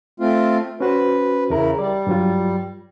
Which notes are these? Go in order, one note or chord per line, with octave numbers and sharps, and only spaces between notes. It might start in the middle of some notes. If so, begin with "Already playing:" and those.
A3 C4 F4
C#4 F#4 B4 C5
E2 C#3 E4 A#4 A#5
G3 D5
G2 F#3 F4